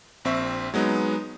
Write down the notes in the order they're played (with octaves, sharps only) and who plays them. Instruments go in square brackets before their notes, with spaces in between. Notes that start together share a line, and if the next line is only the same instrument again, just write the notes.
[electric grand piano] A#1 C4 E5 C#6
F#3 G#3 B3 D#4